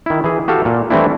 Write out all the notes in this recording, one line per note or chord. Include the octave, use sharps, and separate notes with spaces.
D#3 E4
E3 G#4
F#4 G4 A4 F5
A#2
E3 G3 A3 C4 D4 E4